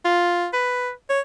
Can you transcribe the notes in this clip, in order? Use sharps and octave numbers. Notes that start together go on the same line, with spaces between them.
F4
B4
C#5